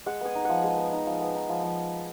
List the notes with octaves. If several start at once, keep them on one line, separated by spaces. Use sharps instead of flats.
G#3 F#5
B3 G#5
D#4
F3 F#5
G#3
B3
D#4
F3
B3
D#4
F3
F3